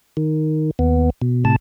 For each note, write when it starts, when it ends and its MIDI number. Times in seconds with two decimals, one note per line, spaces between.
0.17 0.71 51
0.79 1.10 39
0.79 1.10 59
1.22 1.44 47
1.45 1.56 45
1.45 1.56 48
1.45 1.56 81